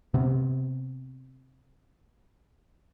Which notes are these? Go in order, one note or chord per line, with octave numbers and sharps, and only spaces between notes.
C3 B3 C4